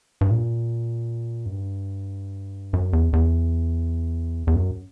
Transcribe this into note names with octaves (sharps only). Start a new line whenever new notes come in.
G2
A#2
F#2
G2
F#2
E2
E2
E2
F#2